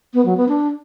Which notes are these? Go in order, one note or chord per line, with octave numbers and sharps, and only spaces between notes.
B3
F#3
B3
D4